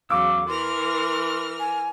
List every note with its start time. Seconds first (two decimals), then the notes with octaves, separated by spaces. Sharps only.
0.10 E2 C#3 F#3 F5 D6 E6
0.48 E3 A#4 C6 F6
1.59 G#5